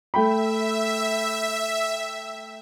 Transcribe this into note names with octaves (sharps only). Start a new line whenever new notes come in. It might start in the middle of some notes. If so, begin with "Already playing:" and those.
A3 E5 G5 B5